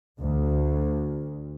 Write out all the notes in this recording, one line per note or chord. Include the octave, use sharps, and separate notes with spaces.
D2